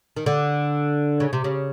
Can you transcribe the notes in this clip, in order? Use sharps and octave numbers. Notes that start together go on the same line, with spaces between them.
D#3
D3
C#3
C3
C#3